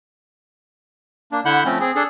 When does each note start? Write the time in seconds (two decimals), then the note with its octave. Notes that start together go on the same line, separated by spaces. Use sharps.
1.32 A#3 D4
1.45 D3 E4 E5 F#5 B5 G6
1.65 F3 A3 C4 C#4
1.80 C4 G#4
1.95 D4 G#4 A4